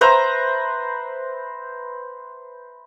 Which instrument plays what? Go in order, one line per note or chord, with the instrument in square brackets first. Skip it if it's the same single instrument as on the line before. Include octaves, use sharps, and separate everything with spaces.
[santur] B4 C5 E5 A#5